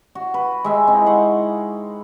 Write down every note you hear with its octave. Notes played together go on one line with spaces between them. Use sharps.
F#4
B4
G#3 E5 G5
C4 D#4 E4
F#5 C6 C#6